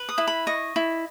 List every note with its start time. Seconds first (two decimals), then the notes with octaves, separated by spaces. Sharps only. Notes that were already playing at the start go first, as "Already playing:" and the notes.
Already playing: B4
0.09 D#6
0.18 E4
0.27 B5
0.47 D#5 C#6
0.76 E4